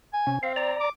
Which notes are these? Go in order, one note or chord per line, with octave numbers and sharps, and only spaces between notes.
G#5
C3 C#4
C4 F5
D5 A#5
D6